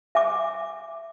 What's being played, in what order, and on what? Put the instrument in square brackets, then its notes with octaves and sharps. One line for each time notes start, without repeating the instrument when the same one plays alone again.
[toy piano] E5 G#5 D6